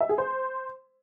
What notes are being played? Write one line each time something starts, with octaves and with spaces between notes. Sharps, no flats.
E5
G#4
C5